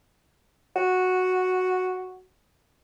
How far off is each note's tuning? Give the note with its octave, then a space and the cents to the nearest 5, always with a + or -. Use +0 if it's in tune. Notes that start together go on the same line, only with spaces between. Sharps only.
F#4 -5